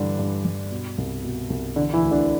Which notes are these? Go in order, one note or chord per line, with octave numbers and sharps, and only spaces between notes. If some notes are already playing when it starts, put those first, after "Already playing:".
Already playing: G2 D3 E3 D4
G2
G2
B2
C2
B2
C2
D3 E3 D4
E3 E4
D2
D3 D4